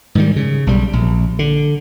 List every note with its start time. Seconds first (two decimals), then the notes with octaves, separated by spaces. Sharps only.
0.15 G#2 D#3 G3
0.36 C#3
0.67 B1 G3
0.93 A#1
1.39 D3